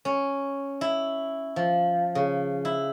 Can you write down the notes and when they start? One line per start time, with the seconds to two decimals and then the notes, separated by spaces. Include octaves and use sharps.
0.05 C#4
0.81 E4
1.56 F3
2.15 C#3
2.65 E4